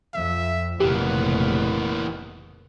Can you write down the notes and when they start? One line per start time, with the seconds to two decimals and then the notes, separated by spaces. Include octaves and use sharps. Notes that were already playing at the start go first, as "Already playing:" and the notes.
0.14 F2 F3 E5
0.80 F1 A#1 C#3 E3 A#3 B3 G4